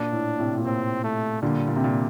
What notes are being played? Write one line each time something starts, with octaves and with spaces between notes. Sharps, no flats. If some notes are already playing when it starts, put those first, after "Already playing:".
Already playing: A#2 D4
A2
A2 C3
A#2
A2 C3 C4
A3
A#2 D3 G3
A#2
C3
A#2